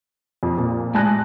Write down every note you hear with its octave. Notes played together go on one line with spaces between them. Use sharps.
F2
A#2
A2 G#3 G#5 A5 F#6 A#6